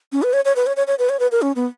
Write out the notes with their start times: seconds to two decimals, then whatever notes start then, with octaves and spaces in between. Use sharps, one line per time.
0.12 C#4
0.23 B4
0.33 C#5
0.45 C#5
0.56 B4
0.66 C#5
0.76 C#5
0.87 C#5
0.99 B4
1.09 C#5
1.20 B4
1.32 A#4
1.42 C#4
1.56 B3